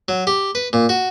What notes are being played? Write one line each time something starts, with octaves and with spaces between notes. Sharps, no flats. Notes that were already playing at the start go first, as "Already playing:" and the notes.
F#3
G4
B4
A#2
F#4